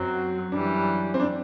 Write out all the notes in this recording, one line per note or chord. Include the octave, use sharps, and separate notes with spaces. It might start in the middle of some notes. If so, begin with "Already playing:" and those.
Already playing: F#2 F#3 C4 F#4
F#2 E3 G3 D4
C4
D4